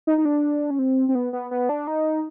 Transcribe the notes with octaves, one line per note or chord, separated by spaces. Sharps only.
D#4
D#4
D4
C#4
C4
C4
B3
B3
B3
D4
D#4